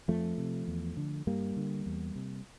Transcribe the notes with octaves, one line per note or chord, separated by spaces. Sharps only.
F2 F3 A3
C3
E2
D3
G2 G3 A#3
D3
E2
C3